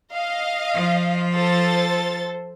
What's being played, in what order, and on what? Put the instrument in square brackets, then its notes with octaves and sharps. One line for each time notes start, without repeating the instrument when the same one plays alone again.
[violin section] D#5 F5
[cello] F3 F4
[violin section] A4 C5 A6